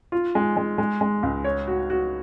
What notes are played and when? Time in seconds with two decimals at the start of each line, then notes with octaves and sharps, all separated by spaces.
0.12 F4
0.35 G#3
0.57 G#3
0.78 G#3
1.01 G#3
1.23 C#2
1.44 C#5
1.67 F#4
1.90 F#4